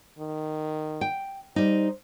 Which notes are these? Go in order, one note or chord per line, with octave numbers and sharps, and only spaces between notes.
D#3
G5
G3 D#4 C5